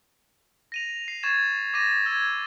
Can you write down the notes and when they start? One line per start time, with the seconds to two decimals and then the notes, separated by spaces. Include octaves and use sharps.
0.72 A#6 D#7 F7
1.08 C7
1.23 C#6 G#6 A6 E7
1.74 D6 A6 A#6 D#7
2.06 E6 G#6